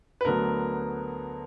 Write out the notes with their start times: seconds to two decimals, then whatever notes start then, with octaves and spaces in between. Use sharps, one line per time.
0.21 B4
0.25 D2 D3 F#3 B3 A#4